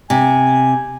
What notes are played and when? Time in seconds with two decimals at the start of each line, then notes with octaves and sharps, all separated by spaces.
0.10 C3 G#5